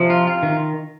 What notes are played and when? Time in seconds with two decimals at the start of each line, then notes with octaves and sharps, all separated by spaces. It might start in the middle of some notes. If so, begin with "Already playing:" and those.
Already playing: C3 F3
0.10 F4
0.27 F4
0.43 D#3